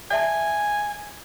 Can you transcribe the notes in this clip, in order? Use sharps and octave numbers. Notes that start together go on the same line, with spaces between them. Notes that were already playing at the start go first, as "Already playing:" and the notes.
D5 E5 G#5 A5